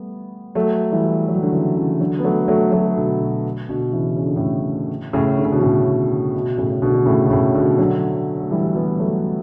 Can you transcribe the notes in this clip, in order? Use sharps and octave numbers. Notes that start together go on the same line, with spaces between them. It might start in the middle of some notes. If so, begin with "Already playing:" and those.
Already playing: G3 A3 B3
F#3 A3
E3 G3
F#3
G3
D3 F#3
C#3 E3
C#3 E3
D3 F#3
B3
F#3 A3
F#3 A3
F#3 A3
B2 D3
B2
B2 D3
C#3 E3
C#3
D3
A2 C#3
A2 C#3
D3
C#3
B2 D3
A2 C#3
B2
A2 C#3
B2 D3
D3
A2 C#3
B2
A2 C#3
B2 D3
D3 F#3
A3
E3 G3
G3 B3
F#3 A3